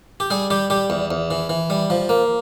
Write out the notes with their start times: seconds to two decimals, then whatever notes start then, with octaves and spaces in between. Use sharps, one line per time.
0.20 G4
0.30 G3 G#4
0.50 G3 G4
0.70 G3 G4
0.90 E2
1.11 E2
1.31 E3
1.49 E3
1.70 G3
1.90 F3
2.09 A#3